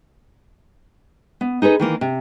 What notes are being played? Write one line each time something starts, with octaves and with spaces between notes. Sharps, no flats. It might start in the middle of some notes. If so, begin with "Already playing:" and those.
B3
D#4 G#4 A4 B4
D#3 E3 A#3
C3